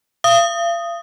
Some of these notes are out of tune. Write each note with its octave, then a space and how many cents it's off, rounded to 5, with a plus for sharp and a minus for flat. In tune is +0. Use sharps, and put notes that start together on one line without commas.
F5 -40 D#6 +0